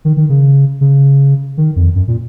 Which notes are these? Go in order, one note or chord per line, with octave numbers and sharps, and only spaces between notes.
D#3
D#3
C#3
C#3
D#3
F2
F#2
A#2